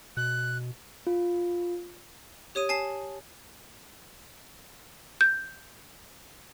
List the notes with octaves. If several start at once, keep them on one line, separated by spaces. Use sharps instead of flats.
B2 F#6
F4
G4 C#5 D#6 D#7
G#5 A5 C7
G6